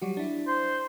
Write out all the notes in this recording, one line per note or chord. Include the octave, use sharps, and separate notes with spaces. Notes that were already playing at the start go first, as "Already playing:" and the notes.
F#3 G3 F#4
D4 E4
C5